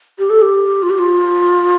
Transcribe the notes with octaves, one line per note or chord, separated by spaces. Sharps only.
G4
A4
G4
F4
G4
F4